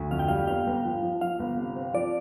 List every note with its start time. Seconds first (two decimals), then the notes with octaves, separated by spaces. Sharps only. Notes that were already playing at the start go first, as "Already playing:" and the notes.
Already playing: D2
0.11 F2 F5
0.19 G5
0.28 G3 F5
0.47 G1 F5
0.67 G1
0.84 F3
1.02 F3
1.21 F3 F5
1.39 G1
1.57 C3
1.76 C4
1.93 F3 D5